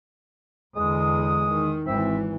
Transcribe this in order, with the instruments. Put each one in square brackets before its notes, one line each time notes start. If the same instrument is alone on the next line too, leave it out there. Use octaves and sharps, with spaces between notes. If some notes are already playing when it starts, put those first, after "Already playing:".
[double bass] E2 D3 [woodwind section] G#3 D#6
[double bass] D#3
[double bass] G#1 E3 [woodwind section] C4 E5